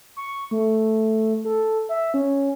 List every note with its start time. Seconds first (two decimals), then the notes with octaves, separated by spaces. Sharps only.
0.17 C#6
0.51 A3
1.45 A4
1.89 E5
2.14 C#4